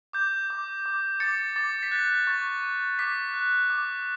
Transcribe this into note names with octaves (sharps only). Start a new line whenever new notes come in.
D6 G6
D6
D6
D6 A6 C#7
D6 A6
B6
F#6 A6
C#6 A6
C#6
D6 B6
F#6
D6